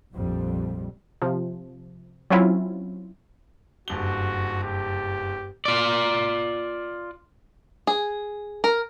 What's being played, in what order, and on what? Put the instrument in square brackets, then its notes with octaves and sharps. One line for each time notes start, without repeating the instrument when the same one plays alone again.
[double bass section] A#1 F2 G3
[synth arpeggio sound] C3 F3
F#3 C4 C#4 E4 F4
[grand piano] F#1 G2 G7 [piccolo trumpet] F#4
[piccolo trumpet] G4
[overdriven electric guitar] F4 D5
[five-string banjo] G#4
A#4